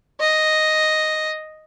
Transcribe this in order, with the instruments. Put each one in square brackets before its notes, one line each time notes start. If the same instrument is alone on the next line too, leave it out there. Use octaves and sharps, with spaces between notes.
[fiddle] D#5